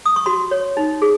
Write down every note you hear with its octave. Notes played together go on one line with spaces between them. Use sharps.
D#6
C#6
F#4 C6
C#5
D#4
G#4